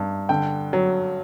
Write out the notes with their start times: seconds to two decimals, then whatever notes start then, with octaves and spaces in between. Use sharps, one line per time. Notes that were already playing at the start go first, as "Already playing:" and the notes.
Already playing: G2
0.29 D3 G5
0.73 F#3